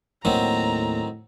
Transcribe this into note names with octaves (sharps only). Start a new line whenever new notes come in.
D#2 A2 D#3 F#3 A#3 C4 A#5